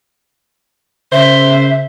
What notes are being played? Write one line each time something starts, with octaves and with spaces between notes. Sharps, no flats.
C#3 C5 E5